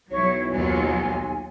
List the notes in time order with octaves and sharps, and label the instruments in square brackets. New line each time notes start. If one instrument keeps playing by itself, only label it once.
[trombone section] B1 [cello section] F#3 E4 [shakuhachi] C#5
[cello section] D#2 F#3 F4 [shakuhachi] G#5